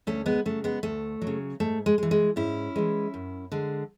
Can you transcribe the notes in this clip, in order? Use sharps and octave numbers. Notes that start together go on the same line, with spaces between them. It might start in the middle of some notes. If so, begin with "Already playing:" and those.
D2 A3 C#4
G#3 B3
C#3 F#3 A3
G#3 B3
D2 A3
F#3
C#3
G#2 A3
G#3
G#3
E3
G#3
G#2 C#4 E4
E3 G#3
F#2
D3 G#3